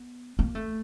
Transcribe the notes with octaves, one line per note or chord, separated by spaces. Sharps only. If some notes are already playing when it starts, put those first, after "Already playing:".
Already playing: B3
A#3
A3